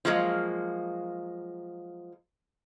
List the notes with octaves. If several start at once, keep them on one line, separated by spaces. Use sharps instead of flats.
F3 F#3 G#3 A#3